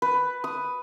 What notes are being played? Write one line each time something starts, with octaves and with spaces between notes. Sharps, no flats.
B4
D#6